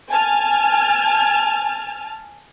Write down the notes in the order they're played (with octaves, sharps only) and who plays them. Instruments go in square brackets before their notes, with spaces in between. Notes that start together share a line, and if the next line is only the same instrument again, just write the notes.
[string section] G#5 A5 F6